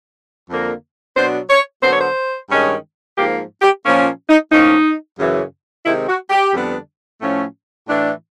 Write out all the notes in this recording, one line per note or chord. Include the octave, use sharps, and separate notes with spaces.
F2 D3 F3 A#3
B2 F#3 B3 D4 C5
C#5
D3 F#3 B3 C5
C#5
C5
G2 D#3 G#3 C#4
G#2 F3 A#3 G4
G4
A#2 F3 A#3 C#4
D#4
A2 F3 A#3 C#4 D#4
F#2 C#3 E3
C3 D#3 G#3 C4 E4
F#4
G4
F2 D3 G3 B3 D4
A2 F3 A3 C#4
A2 E3 A3 D4